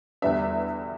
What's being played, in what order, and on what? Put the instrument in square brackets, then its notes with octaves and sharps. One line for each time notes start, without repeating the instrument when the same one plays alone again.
[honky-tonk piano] E2 D3 G3 B3 D4 E5